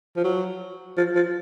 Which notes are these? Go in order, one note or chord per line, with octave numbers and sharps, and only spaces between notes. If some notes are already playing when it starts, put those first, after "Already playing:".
F3
F#3
F3
F3